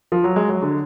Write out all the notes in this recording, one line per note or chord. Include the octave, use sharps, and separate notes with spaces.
F3
F#3
G#3
F#3
D3